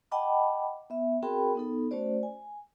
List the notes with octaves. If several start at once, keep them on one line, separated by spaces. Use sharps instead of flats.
D#5 F#5 G5 A5 B5 D6
B3 E5
C4 F#4 G#4 A#4 G5 B5
B3 D#4 A4
A3 C#4 F#4 C5 D5
G#5